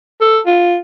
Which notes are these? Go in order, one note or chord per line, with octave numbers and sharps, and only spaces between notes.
A4
F4